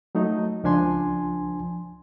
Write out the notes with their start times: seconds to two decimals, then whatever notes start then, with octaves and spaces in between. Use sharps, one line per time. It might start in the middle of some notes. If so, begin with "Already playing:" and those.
0.15 F#3 A3 D#4
0.64 C#2 F3 D4 G#5 C6